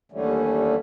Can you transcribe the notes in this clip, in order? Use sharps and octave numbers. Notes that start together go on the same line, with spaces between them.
D#2 D3 E3 G3 A3 C#4